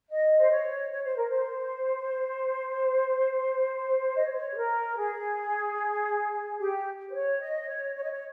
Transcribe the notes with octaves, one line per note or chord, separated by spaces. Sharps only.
D#5
C5
C#5
C#5
C5
A#4
C5
D#5
C#5
C5
C#5
G#4
A#4
G#4
G4
C5
C#5
D#5
C#5
C#5
D#5
C#5